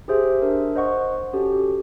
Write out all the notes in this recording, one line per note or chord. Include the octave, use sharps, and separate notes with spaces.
G4 G#4 C5 E5
D4 A#4 E5
C5 D#5 F#5 C#6
C#4 F#4 G4 A4